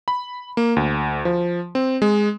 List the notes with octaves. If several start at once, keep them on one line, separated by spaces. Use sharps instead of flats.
B5
A#3
D2
F3
C4
G#3